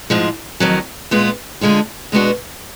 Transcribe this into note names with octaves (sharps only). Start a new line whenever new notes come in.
G#2 F3 G#3
F2 D#3 F#3
A#2 G#3 B3 F4
D3 G#3 D4 F4
B2 G#3 B3 D4 F#4